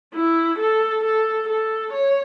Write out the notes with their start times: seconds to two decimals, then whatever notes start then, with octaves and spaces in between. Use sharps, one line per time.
0.15 E4
0.59 A4
1.04 A4
1.47 A4
1.93 C#5